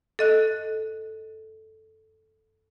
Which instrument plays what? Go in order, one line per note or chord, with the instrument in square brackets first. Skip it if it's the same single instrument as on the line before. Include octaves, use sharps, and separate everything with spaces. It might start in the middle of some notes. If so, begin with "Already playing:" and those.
[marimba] A4 D#5 F#6